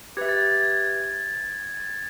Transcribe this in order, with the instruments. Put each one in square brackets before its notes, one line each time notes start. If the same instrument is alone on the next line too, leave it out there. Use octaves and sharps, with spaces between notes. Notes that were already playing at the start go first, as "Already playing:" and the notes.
[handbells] G4 B4 E5 [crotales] G#6
[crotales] A6
G#6
A6
G#6
A6
G#6